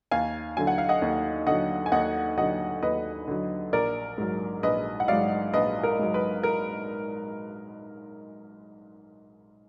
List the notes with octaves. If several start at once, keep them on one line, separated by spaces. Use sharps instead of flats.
D#2 F5 G#5
D3 F#3 G#5
F#5
F5
D#5 F#5
D#2
D3 F#3 D#5 F#5
G#5
D#2 D#5 F#5
D3 F#3 D#5 F#5
D#2 B4 D#5
D3 F#3
A#1 A#4 D5
G#2 F#3
A#1 B4 D#5
F#5
G#2 F#3 D5 F5
A#1 B4 D#5
A#4
G#2 F#3
B4
A#4